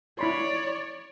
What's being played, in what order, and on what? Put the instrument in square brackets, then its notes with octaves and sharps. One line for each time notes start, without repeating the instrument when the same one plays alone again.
[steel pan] E4 B5 C6 [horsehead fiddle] C#5 D5